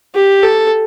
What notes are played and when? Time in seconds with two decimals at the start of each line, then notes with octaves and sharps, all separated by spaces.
0.15 G4
0.43 A4